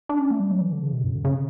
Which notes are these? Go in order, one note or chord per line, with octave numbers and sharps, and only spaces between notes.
D4
C#4
A3
G3
F#3
E3
D3
C#3
B2
F#2
D3
C#3